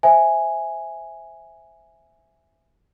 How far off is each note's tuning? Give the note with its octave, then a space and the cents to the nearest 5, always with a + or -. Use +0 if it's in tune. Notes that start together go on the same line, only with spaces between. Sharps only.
C5 +5 E5 +0 G#5 +0